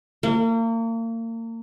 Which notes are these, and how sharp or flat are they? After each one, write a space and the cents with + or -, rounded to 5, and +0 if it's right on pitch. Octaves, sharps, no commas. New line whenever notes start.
A#3 -35